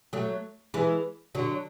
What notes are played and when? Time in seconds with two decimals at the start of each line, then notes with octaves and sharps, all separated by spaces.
0.13 F#3 A3
0.74 E3 G#3
1.35 D3 F#3